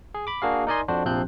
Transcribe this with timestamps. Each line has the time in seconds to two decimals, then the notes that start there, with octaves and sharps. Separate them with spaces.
0.14 G#4
0.27 B5 D6
0.42 A#3 D4 F#4 G#4 F5
0.67 D#4 A#4 D5 D#5 G#5 C6
0.88 F2 D4 F#4 C5
1.05 A#1 C3 F3 C4 F#6 G6